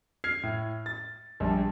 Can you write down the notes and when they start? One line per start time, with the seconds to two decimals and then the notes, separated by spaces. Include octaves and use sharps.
0.24 F6 G#6 C7
0.43 A2
0.86 A6
1.40 A#1 G3 A5